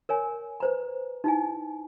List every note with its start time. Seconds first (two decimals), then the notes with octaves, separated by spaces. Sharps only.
0.09 A#4 C#5 G#5
0.60 B4 C5 A#5
1.24 D#4 E4 G#5